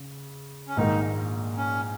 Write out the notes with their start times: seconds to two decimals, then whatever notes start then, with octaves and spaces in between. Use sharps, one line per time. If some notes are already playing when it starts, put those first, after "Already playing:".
Already playing: C#3
0.68 C#4
0.77 A#1 G#2 D#3 A#3 D#4
1.57 C#4